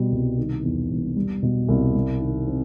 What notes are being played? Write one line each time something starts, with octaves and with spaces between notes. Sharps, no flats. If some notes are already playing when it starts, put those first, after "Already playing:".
Already playing: B2 G3
C2
D#3
E2
E1
G3
B2
C2
G3
D#3
C4